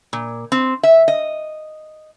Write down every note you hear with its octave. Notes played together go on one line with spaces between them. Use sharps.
A#2
C4
E5
D#5